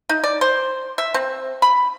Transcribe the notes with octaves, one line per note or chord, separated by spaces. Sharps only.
D#4
D5
C5
E5
C4
B5